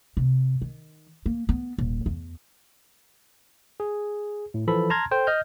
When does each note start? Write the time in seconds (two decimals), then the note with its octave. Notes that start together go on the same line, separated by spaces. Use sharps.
0.17 C3
0.62 D#3
1.26 A#3
1.49 B3
1.78 D#1
2.06 E2
3.80 G#4
4.54 A2
4.67 E3 F3 A4 B5
4.90 A5 A#5 C6 F6 G#6
5.11 A4 C5 G5
5.27 D#5 F6 G6